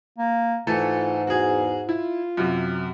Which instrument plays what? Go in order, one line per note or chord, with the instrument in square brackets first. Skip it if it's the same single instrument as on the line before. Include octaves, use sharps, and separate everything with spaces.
[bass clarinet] A#3
[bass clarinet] G#2 [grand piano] E3 A3 A4 [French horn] F4
[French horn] E2 [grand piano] F#4 G#4
[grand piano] E4 [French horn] F4
[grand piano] F#2 C3